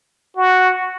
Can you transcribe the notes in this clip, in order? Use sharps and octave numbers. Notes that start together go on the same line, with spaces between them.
F#4